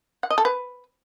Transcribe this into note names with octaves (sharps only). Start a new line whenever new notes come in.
F#5
D#5
A4
B4